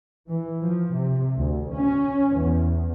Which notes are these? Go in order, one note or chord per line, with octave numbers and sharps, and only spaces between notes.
E3
F3
C3
D2
C#4
E2